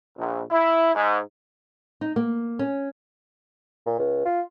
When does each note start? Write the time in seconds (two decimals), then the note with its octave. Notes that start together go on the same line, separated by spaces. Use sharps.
0.18 A#1
0.51 E4
0.94 G#2
2.01 D#4
2.16 A#3
2.59 C#4
3.86 A#2
3.99 C#2
4.25 F4